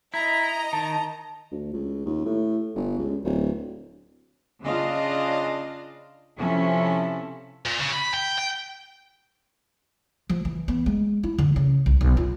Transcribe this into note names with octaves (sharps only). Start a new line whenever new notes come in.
E4 D#5 A#5
D#3 A5
D2
C#2
D#2
A2
G1
C#2
D1
C#3 D4 F4 D#5 F5
C3 F3 C#4 E4 A4
A#2
C#3
B5
G5
G5
F3
E3
B3
G#3
E4
D3
C#3
C2
B1
F4